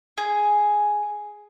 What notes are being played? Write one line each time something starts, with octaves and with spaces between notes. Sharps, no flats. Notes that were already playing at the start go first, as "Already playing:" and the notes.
G#4